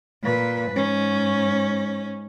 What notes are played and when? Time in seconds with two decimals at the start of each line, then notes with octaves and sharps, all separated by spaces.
0.23 A#2 B4
0.72 G#2 C#4